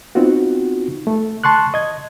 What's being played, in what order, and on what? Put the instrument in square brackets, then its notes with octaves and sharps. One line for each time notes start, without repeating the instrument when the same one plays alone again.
[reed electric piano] B3 C4 D#4 F4 F#4
A3
A5 C6 C#6 F#6
D#5 G#6